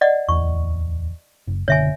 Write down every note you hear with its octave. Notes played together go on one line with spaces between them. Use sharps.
D5 D#5 F#5
D1 E2 C#6
F#1
F#1 B2 D3 C#5 E5 G#5